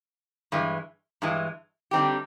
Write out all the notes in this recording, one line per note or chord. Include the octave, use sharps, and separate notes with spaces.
G2 E3 G#3
G2 E3 G#3
D3 G3 C4 D#4 G4